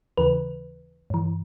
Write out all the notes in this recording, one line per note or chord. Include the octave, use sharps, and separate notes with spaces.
D#2 C#3 E3 B4
G2 E3